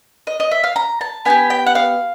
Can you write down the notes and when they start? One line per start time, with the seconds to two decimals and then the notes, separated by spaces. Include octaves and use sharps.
0.27 D#5
0.40 D#5
0.51 E5
0.64 F5
0.76 A#5
1.01 A5
1.25 B3 D#4 G4 G#5
1.50 G5
1.67 F#5
1.75 F5